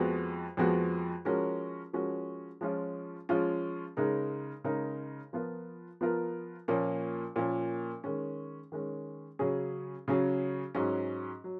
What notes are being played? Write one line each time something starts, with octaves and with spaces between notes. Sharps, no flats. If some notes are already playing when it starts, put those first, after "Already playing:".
Already playing: F2 F3 G#3 B3 F#4
F2 F3 G#3 B3 F#4
F3 G#3 C#4 F#4 A#4
F3 G#3 C#4 F#4 A#4
F3 G#3 C#4 F4
F3 G#3 C#4 F4
C#3 G#3 D#4 A#4
C#3 G#3 D#4 A#4
F3 B3 F4 A#4
F3 B3 F4 A#4
A#2 F3 A#3 C#4
A#2 F3 A#3 C#4
D#3 G#3 C#4
D#3 G#3 C#4
C#3 F#3 C#4 G#4
C#3 F#3 C#4 G#4
G#2 F#3 C#4
F#3